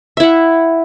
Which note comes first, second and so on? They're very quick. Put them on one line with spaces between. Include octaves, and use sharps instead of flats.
E5 E4 F#5